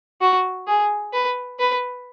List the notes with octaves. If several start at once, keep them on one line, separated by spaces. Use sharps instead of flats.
F#4
G#4
B4
B4